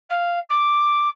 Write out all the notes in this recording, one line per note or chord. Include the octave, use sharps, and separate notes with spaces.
F5
D6